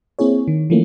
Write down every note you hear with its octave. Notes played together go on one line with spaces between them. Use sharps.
A#3 C4 E4 G#4 C#5
D#3
E3 F3 A3 A#3 C#4